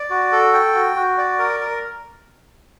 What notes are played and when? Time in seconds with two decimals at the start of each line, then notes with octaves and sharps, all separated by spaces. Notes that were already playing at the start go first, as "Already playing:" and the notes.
Already playing: D5
0.10 F#4
0.32 A4
0.54 G5
0.75 F#4
0.96 F#4
1.18 D5
1.39 A#4
1.60 A#4